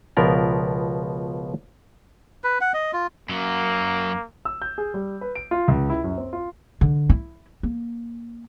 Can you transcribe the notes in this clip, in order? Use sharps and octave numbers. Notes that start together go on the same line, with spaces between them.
C#2 B2 F3 B3 A#4 D5
B4
F#5
D#5
F4
F#2 F#3 A#3
E6
G6
G#4
G3
B4
D7
F4
C#2
E4
F#2
C4
F4
D3
E4
A#3